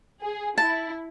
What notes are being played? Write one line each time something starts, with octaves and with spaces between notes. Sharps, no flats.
G#4
E4 A5